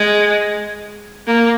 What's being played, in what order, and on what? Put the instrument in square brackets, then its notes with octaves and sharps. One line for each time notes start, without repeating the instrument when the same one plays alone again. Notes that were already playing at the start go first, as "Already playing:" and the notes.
Already playing: [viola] G#3
A#3